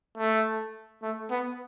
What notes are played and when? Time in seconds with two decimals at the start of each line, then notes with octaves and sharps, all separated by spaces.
0.18 A3
1.03 A3
1.31 B3